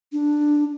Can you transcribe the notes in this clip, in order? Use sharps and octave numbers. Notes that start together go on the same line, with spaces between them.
D4